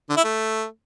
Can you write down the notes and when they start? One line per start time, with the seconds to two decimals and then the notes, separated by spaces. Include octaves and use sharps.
0.10 D3
0.17 E4
0.24 A3